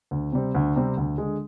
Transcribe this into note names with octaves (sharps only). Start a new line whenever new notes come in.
D2
C3 G3 C4
D2
C3 G3 C4
D2
D3 G#3